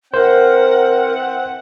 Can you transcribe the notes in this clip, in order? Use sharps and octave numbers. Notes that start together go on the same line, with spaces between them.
E3 C4 A#4 C5 F#5